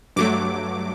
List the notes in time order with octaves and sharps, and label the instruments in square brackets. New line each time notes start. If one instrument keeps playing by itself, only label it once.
[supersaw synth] G2 F#3 A3 D6